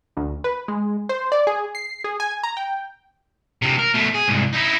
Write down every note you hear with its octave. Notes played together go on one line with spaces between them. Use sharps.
D2
B4
G#3
C5
D5
G#4
C7
G#4
G#5
A#5
G5
D2 C3
A#4
B2 A3
G#4
C2 G#2
D#4 E4